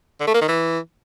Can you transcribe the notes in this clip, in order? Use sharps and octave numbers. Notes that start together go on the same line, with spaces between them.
D3
A3
A#3
D#3
E3